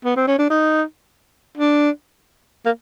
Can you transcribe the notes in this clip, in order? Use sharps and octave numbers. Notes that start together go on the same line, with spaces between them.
B3
C4
C#4
D4
D#4
D4
A#3